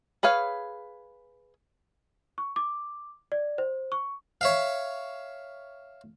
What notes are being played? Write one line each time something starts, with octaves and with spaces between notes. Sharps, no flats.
G#4 B4 C#5 F5
C#6
D6
D5
C5
C#6
C#5 E5 F5